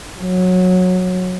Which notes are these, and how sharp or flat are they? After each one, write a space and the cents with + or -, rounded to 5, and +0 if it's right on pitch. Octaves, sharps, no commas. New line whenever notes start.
F#3 -15